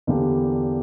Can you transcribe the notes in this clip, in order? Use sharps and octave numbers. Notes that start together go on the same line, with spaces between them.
E2 D3 A#3 D4 G4